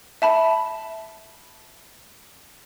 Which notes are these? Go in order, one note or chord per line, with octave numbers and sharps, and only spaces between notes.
E5 A5 B5